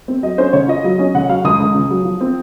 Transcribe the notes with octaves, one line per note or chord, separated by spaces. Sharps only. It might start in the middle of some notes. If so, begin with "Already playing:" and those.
C4
F#3 D#5
C#4 C5
C#3 C#5
F4 D#5
F#3
C#4
C#3 F#5
F#3 F5
C#2 D#6
C#2
C#3
F#3
F3
C4